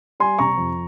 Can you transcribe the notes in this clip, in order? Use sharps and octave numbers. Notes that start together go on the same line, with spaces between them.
G3 G#5 C6
C3 A#5 C#6
F2